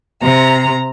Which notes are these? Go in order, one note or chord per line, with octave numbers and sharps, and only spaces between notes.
C3 A#5